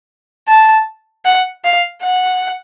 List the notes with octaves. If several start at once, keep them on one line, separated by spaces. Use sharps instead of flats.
A5
F#5
F5
F#5